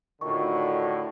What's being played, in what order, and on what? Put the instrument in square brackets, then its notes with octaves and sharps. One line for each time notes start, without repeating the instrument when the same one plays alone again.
[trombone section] A2 D3 [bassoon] D#3 [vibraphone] D#4 F4 F#4 [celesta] C#6